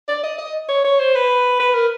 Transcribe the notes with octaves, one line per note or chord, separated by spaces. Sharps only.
D5
D#5
D#5
C#5
C#5
C5
B4
B4
A#4